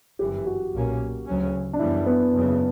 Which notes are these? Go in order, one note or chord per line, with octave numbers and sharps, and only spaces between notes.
G1 F#2 E3 G4
F#4
B1 A#2 A#3 C#4
D2 C#3 F#3 C#4
D4
F#2 E3 G3 B3 E4
B3
F#1 E2 C#3